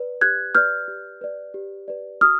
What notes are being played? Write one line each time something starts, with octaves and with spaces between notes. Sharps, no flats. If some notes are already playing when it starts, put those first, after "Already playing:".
Already playing: B4 D5
G4 F#6 G#6
B4 D5 F6 G6
G4
B4 D5
G4
B4 D5
F#4 D#6 F6